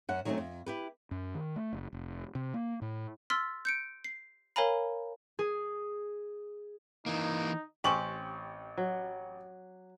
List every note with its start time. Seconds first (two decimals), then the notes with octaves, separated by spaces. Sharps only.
0.09 F#2 F#5
0.25 D#3 F#3 G3 A3 C4 C#4
0.38 F2
0.66 E4 G4 B4
1.11 F#2
1.35 D#3
1.56 A3
1.73 F#1
1.93 F1
2.35 C3
2.54 A#3
2.82 A2
3.30 C6 E6 F6 A6 B6
3.65 G6 C#7 D7
4.04 C7
4.56 A#4 C#5 F5 G#5 A#5 B5
5.39 G#4
7.06 E3 A#3 D#4
7.84 A1 C4 C#4 G4 C#6 F#7
8.77 F#3